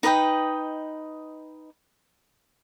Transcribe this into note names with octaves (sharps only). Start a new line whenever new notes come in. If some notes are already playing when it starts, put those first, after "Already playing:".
D#4 B4 D#5 G5